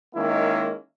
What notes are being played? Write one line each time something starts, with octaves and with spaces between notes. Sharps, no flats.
D#3 G#3 A#3 C#4 E4